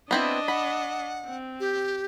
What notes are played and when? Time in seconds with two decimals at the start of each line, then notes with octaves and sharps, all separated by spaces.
0.11 B3 C4 D4 E4 D#5
0.48 F#5 B5
1.27 C4
1.60 G4